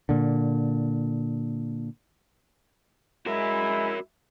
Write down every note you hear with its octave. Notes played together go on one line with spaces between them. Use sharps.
A#2 D3
G#3 E4 F#4 A#4